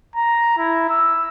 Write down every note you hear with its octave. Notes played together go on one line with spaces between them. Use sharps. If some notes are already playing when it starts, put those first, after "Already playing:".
A#5
E4
E6